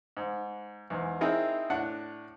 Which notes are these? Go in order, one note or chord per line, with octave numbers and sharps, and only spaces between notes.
G#2
E2 G#2
C4 D#4 E4 G#4 A#4
A2 D4 F#5